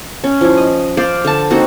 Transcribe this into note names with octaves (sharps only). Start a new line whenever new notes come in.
C#4
F3 E4
D#5
C5 D5 F5
D3 A5
A#3 C4 D#4 F#4